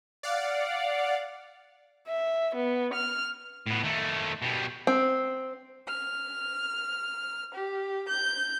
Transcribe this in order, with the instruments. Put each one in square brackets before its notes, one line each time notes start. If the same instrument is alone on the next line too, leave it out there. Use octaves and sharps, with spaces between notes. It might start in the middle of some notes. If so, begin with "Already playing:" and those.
[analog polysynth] D5 F5 F#5
[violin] E5
B3
F6
[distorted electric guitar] A2 B3
D#3 A3
B2 G3
[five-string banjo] C4
[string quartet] F6
G4
G6